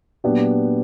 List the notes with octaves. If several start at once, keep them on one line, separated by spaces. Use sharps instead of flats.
A#2 F#3 B3 D4 G4